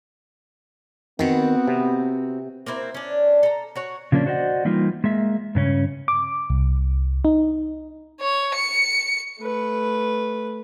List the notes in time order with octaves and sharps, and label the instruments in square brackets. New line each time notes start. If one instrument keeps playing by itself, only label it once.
[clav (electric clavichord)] D#3 [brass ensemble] B3 [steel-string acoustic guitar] C4 F#4
[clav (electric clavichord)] C3
[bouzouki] A#3 C4 E4 C5
C#4 D4
A4 A#5
F#4 C#5 F#5
[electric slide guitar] C#3 F3 A#3 C#4 D4
F#4 C5 D5 D#5 F#5
E3 G3 A#3 D#4 F4
G#3 A#3 E5
G2 C#3 C#4
[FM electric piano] D6
C2
D#4
[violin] C#5
C#7
[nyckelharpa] A3 B4